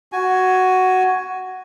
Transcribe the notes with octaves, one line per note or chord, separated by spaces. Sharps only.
F#4 G#5